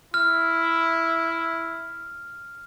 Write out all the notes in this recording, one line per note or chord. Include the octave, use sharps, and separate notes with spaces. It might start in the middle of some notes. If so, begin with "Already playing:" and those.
E4 F6